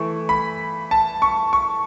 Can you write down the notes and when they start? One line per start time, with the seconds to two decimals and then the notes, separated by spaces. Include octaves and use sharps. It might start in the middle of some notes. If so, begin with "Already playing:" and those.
Already playing: E3 A3 E4 C#6
0.29 B5
0.91 A5
1.22 C#6
1.53 C#6